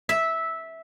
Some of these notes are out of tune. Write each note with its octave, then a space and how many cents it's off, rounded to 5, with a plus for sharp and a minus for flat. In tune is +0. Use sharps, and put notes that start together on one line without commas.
E5 -10